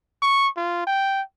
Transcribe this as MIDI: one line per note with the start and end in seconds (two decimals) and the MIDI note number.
0.22 0.48 85
0.57 0.84 65
0.87 1.22 79